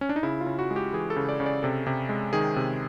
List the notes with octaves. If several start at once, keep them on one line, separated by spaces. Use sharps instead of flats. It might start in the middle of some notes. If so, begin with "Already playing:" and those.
C#4
D4
D#4
C#3 E4
F4
C#3
F#4
G#3
G4
E3 G#4
A4
C#3
D5
C#3
D5
C3 A4
C3
G#3
D#3 G#4
C3